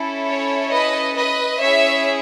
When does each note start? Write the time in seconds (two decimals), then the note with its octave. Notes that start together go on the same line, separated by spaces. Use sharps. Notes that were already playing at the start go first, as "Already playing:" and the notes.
Already playing: C#4 E4 A4
0.28 C#5
0.73 B4 D#5
1.17 B4 D#5
1.61 C#4 E4 G#4 C#5 E5